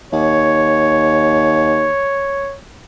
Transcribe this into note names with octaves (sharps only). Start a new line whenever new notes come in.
D#2 C#5